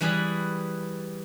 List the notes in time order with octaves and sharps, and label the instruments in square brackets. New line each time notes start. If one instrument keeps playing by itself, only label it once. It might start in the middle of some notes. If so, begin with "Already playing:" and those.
[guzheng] E3 G3 G#4 B4